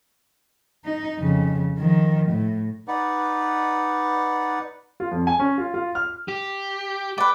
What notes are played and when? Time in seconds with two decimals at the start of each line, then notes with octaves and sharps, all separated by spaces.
0.85 D#4
1.18 F2 C#3
1.78 D#3 F3
2.32 A2
2.88 D#4 B4 D5 F#5
5.00 F4
5.11 F2
5.27 G#5
5.39 C#4
5.58 F4
5.74 F4
5.95 F6
6.28 G4
7.18 B4 D5 G5